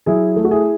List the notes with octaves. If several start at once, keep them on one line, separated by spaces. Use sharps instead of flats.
F#3 E4 G#4
A3
F#4
E4 G#4